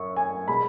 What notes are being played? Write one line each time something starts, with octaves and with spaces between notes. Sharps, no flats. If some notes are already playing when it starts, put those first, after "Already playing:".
Already playing: F#2 C#6
G#5
B2 G#3 B5